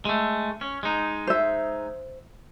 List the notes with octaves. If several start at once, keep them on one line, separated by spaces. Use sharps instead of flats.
G#3 A3
C#4
G#3 D#4
C5 E5